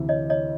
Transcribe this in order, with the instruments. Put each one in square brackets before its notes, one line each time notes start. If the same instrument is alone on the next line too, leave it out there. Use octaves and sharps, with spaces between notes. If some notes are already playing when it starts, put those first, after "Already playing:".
Already playing: [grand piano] D2 C3 E3
[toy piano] C#5 D#5
C#5 D#5